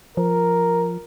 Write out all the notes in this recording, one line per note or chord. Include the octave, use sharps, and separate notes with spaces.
F3 A#4